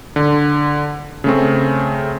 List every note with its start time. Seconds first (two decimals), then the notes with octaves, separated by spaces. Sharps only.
0.16 D3
1.24 C#3 A3 C4